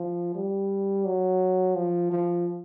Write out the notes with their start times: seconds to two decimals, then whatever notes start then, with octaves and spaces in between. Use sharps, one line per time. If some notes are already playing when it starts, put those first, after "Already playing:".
Already playing: F3
0.35 G3
1.05 F#3
1.75 F3
2.12 F3